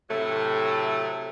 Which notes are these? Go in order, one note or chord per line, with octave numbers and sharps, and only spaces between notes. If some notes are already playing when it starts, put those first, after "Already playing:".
A2 C3 F#3 A3